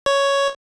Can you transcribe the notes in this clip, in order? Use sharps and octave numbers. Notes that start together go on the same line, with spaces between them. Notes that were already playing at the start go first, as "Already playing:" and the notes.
C#5